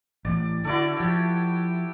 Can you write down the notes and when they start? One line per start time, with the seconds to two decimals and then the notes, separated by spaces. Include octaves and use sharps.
0.25 A1 D5
0.65 D3 E4 F#4 A4 D5
1.00 F3 G4